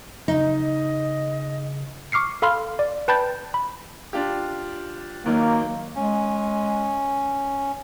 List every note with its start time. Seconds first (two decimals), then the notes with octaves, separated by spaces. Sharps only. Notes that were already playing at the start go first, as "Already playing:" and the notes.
0.28 C#3 D#4 D#5
2.12 C#6 D6 F6 C7 C#7
2.42 A4 F5 B5 C6 F6
2.79 D5
3.08 B4 G5 A5 B5 G6 A6
3.54 B5
4.13 D4 F4 G4
5.26 D#2 D#3 F#3 A#3
5.96 G#3 C#4